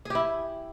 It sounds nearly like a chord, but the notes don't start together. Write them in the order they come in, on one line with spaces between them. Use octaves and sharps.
G#4 G4 E4